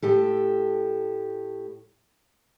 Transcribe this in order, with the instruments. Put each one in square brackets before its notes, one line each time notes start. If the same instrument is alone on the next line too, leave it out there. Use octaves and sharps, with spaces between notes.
[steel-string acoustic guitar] A2 G4 A4